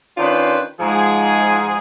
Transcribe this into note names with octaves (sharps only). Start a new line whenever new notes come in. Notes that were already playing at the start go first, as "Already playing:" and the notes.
D#3 C#4 D4 F4 B4 C5
G#2 F3 G#4